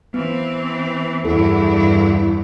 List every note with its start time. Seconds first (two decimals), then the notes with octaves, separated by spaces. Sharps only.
0.14 E3 B3 C4
1.25 E2 G2 E4 A4